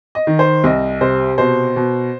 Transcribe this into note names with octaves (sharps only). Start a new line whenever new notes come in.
D#5
D#3
C5
C2 D#5
C3 C5
B2 C5
B2